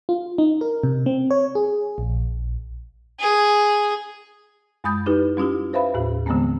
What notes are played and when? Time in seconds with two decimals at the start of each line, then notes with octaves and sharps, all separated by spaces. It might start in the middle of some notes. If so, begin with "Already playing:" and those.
0.09 F4
0.38 D#4
0.61 A#4
0.83 C3
1.06 C4
1.31 C#5
1.55 G#4
1.98 A#1
3.20 G#4
4.84 F#2 G#3 B5 D#6 G6 A6
5.06 D#4 E4 G4 B4
5.37 G3 C#4 E4 F4 G4
5.73 B4 C5 E5 F5 B5
5.94 D#2 A2 F#4
6.26 D3 E3 G#3 A3 B3 C4